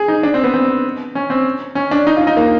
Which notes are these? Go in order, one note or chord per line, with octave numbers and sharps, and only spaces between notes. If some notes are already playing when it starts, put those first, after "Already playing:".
Already playing: G#4
D#4
D4
C4
B3
C4
C#4
C4
C#4
D4
D#4
F4
D#4
A#3